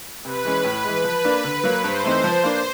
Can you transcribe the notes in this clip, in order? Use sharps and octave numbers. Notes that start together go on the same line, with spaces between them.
C3 B4
E3 G#3 C#4
A2
E3 G#3
F3 B4
A#3 D4
D3
F#3 A#3
G2 C5
E3 A3 C4 D#4
F3
A#3 D4